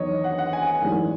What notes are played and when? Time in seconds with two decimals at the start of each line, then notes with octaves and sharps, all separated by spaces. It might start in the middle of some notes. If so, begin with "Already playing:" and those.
Already playing: E2 D#3 F#3 C#5 D#5
0.24 F#5
0.38 F#5
0.53 G#5
0.81 G#1 F#2 E3 G#3